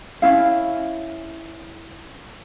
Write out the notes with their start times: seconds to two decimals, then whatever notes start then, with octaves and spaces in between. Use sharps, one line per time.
0.22 C#4 E4 F5